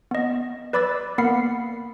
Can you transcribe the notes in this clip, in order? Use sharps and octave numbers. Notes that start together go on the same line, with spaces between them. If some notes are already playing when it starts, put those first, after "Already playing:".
B3 D#5
B4 D5 B5 D6 E6 A6
A#3 B3 A#4 F#5 B5 C7